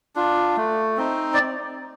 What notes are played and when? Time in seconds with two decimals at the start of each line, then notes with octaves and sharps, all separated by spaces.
0.16 D4 F4
0.57 A3
0.97 C4 D#4
1.34 D5